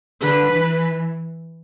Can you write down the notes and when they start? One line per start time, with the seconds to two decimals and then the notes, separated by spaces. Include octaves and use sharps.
0.22 D3 B4
0.53 E3